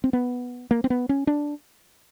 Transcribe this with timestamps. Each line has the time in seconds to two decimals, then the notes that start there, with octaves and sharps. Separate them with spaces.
0.04 C4
0.13 B3
0.71 A#3
0.84 C4
0.90 B3
1.09 C#4
1.27 D4